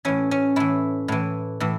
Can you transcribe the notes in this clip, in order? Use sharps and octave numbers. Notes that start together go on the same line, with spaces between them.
A2 E3 C#4
C#4
A2 E3 E4
A2 E3
A2 E3